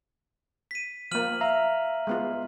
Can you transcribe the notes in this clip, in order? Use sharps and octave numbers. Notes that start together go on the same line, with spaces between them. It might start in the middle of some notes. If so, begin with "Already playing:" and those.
B6 D#7
F3 A#3 F6 D#7 F#7
E5 F5 A#5
G#3 B3 F4